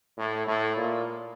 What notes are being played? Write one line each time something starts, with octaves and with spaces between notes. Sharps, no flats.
A2
A2
A#2